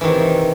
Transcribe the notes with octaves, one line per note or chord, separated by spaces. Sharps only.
C3 D#3 E3